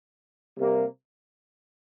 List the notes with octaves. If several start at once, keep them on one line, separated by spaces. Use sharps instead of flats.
C3 G3 A#3